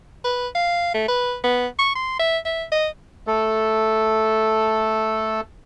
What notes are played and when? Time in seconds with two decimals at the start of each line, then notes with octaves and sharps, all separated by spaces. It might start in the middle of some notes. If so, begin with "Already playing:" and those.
0.24 B4
0.55 F5
0.94 A3
1.08 B4
1.44 B3
1.79 C#6
1.95 C6
2.19 E5
2.45 E5
2.72 D#5
3.27 A3 A4